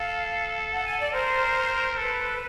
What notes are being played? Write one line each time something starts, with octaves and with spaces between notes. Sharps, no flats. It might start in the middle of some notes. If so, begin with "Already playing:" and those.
Already playing: A4 F5
F#5
G#5
D5
A#4 C5
A4 B4